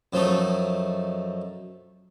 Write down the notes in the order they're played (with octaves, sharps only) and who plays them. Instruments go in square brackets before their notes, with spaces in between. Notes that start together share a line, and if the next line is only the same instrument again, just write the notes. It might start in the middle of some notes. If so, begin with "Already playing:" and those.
[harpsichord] F#2 F3 A3 D#4